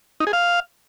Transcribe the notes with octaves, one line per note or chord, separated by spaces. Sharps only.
D#4
G#4
F5